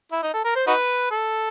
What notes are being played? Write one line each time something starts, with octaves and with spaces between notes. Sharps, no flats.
E4
D#4
A4
A#4
C5
D#4 F#4 B4
A4